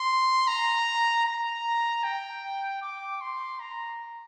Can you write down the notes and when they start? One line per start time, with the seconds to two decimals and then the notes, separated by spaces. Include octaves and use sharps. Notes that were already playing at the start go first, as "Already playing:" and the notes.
Already playing: C6
0.47 A#5
1.25 A#5
2.03 G5
2.82 D6
3.21 C6
3.60 A#5